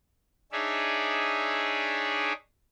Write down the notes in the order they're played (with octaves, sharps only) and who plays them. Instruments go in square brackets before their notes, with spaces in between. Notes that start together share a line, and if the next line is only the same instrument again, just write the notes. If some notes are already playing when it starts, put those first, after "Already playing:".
[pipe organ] D4 D#4 G#4 C#5 D5 E5